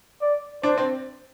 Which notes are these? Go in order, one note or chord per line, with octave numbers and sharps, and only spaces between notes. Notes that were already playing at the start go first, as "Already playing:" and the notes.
D5
D4 C5
C4